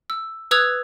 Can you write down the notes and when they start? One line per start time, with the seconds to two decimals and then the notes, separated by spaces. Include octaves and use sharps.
0.10 E6
0.51 B4 D#6 E6 F#6 G#6 F7